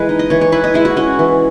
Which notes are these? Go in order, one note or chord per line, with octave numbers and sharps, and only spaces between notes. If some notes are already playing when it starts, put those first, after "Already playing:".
Already playing: E3 G#3 B4
D#4
D#5
E3 C#5
C#5
E4 B4
D#5
G#3 E4
F#4
C#4 F#4
E3